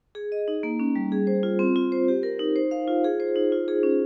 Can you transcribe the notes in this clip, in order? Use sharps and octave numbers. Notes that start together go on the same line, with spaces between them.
G#4
D#5
D#4
A#3
C#4
G3
G#4
C5
F4
C4
F4
C5
G4
A#4
D#4
C5
F5
F4
G#4
C5
D#4
F4
G#4
C#4